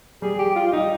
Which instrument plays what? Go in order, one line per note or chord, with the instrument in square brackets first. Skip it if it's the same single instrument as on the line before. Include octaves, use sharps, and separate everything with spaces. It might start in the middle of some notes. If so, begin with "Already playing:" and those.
[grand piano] G3 G4 [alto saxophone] G#4
[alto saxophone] G4
F4
F4
[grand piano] G3 G4 [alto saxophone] D#4